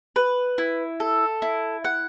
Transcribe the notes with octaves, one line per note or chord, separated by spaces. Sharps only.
B4
E4
A4
E4
F#5